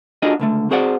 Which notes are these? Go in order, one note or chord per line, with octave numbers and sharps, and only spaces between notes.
D4 F4 F#4 G#4 A4 D#5
C#2 D3 A3
C4 F#4 G#4 C5 D5 F#5